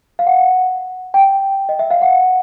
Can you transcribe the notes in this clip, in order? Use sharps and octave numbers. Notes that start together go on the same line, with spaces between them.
F5
F#5
G5
D#5
E5
F5
F#5